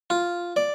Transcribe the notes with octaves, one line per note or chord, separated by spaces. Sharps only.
F4
D5